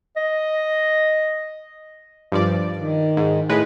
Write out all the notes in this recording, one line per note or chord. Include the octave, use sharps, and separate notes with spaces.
D#5
G2 F3 D5
D#3
G#2
A2 G#3 B4